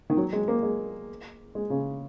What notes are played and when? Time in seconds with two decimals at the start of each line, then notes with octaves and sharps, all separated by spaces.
0.10 D#3
0.17 F#3
0.33 G#3
0.48 A#3
0.63 G#3
1.55 G#3
1.70 C#3